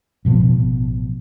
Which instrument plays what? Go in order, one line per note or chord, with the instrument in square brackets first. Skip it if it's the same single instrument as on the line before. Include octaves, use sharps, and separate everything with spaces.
[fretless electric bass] A1 B2 F3 B3